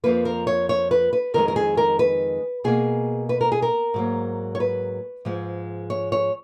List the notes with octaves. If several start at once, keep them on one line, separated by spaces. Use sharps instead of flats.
F2 F3 A#3 B4
A#4
C#5
C#5
B4
B4
F2 D#3 G#3 A#4
A#4
G#4
A#4
B4
B2 A#3 G#4
B4
A#4
G#4
A#4
G#2 F#3 A#3
C#5
B4
G#2 F3 G#3
C#5
C#5